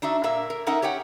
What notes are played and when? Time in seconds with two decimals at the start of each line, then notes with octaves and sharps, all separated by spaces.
0.02 D4 D#4 F#4 E5
0.24 A#2 A#3 A#4 E5
0.50 A#4
0.66 C#4 D#4 A#4 E5 F#5
0.82 G4 C#5 F#5 G5